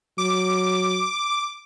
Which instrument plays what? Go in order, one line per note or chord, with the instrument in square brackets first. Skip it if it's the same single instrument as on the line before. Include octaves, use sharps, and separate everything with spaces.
[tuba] F#3 [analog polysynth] D6